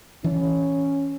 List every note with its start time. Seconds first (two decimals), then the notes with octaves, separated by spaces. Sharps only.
0.24 E3 C#4